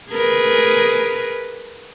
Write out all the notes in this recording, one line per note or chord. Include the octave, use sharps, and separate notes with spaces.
G#4 A#4 B4